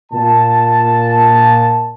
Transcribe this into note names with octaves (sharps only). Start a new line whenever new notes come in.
A#2 A5